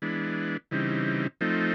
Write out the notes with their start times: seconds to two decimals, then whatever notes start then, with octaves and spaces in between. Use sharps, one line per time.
0.02 E3 G#3 B3 D4
0.71 C#3 E3 G3 C4 D#4
1.41 F3 A3 C4 D#4